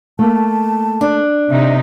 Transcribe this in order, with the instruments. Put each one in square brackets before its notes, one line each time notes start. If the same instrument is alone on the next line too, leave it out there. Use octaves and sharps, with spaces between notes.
[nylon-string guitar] A3 A#3 [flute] A5
[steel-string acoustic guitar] D4
[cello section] C3 D#4 [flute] E5